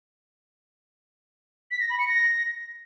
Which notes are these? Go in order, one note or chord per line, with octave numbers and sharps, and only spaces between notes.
B6
A#6
B5
C#7
A#6